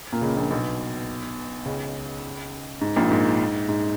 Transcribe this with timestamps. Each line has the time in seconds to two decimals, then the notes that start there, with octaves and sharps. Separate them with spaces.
0.12 A#2 A#3
0.21 C#2 C#3
0.36 A#1 A#2
0.51 B1 B2
1.66 C#2 C#3
2.81 G#2
2.96 A#1 A#2
3.11 G#2
3.68 G#2